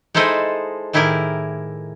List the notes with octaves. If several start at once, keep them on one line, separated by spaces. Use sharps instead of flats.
G#3 D#4 E4 A4 C5 D#5
A2 D#3 E4 G4 G#4 A#4